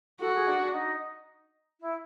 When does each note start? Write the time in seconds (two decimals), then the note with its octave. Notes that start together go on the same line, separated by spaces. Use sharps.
0.20 F#4 A4
0.34 G#4
0.47 D4
0.61 D4
0.73 D#4
1.80 E4